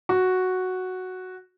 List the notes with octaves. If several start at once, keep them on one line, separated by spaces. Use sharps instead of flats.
F#4